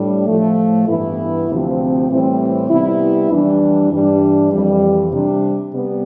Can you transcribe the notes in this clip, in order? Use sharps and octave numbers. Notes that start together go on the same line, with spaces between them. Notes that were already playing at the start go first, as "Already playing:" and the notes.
Already playing: A2 G3 D4
A2 F3 A3
G2 E3 B3 E4
D2 C3 F3 C4
A2 E3 G3 C4 E4
C3 G3 B3 E4
F2 E3 G3 D4
G2 E3 G3 D4
F2 E3 G3
C3 G3 D4
C3 G3 B3